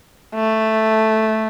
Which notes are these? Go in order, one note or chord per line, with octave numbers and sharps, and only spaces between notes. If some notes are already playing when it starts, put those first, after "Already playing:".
A3